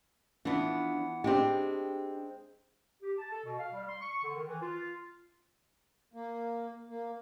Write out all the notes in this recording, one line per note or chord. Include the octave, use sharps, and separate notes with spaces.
E3 F3 B3 D4
G#3 C4 D4 G4
G4
A5
A4
B2
F5
G3
C6
C#6
D3
D#3
E3
F4
A#3
A#3